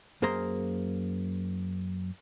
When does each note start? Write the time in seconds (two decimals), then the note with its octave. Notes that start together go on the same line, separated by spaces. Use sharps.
0.22 F#2 A#3 G#4 C5 A#5 C6